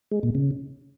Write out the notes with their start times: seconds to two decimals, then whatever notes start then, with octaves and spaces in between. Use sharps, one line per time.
0.11 G#3
0.23 A#2
0.35 C#3